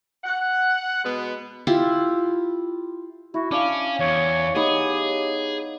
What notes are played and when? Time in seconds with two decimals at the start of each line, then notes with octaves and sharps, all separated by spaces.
0.24 F#5
1.03 B2 G#3 B3
1.67 E4 F4 G4
3.34 E4 F#4
3.51 C#4 D4 F5 D6
3.99 E2 C#5
4.55 B3 D#4 G4 G#4 C#5